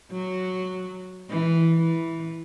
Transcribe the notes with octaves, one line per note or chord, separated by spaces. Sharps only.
F#3
E3
E3